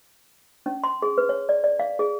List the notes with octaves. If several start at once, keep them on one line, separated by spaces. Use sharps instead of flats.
C#4
C6
G#4
B4
C#5
D5
D5
F5
G#4